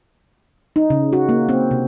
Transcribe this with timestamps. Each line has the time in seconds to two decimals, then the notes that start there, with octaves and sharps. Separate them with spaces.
0.76 D#4
0.90 C#3
1.13 F#4
1.29 A#3
1.49 C4
1.71 C3